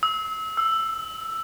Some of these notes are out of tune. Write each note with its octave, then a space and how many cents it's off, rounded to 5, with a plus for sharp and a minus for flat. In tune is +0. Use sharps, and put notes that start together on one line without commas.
E6 -30
E6 +5